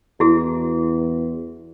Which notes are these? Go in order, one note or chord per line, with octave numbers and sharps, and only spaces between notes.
E2 E4 F#4 G#4